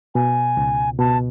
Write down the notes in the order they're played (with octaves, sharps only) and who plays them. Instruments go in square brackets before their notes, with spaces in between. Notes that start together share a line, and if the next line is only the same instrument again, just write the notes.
[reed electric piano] B2 [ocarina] G#5
[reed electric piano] C#2
[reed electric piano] B2 [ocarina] A5